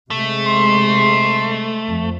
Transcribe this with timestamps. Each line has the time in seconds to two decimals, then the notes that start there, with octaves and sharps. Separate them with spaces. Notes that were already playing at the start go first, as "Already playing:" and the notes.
0.11 C3 G#3 A3
0.46 C6
1.89 F2